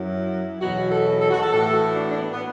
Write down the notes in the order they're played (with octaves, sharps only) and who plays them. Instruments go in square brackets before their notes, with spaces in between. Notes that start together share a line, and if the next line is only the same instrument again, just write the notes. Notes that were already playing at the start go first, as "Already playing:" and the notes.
Already playing: [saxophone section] F#2 F#3 E4
E2 B2 F#3 F#4
A4
A4
F#4
A4
A2 E3 A4
F#4
D4
D4
B3
B3